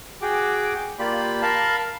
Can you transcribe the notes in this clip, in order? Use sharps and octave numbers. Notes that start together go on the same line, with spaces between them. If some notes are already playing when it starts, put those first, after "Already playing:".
F#4 G#4 G5 D6
A#3 F4 G4 D5 B5
A#4 F5 A5 B5